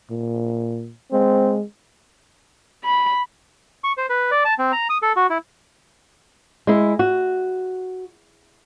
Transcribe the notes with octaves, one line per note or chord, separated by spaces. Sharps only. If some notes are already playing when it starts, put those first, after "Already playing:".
A#2
G#3 C4
B5
C#6
C5
B4
D5
A5
C4
A#5
D#6
A4
F#4
E4
G#3 E4
F#4